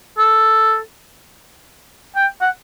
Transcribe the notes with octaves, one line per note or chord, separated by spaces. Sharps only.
A4
G5
F#5